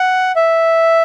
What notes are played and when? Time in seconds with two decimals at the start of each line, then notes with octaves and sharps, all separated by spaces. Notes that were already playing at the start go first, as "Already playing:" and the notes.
Already playing: F#5
0.36 E5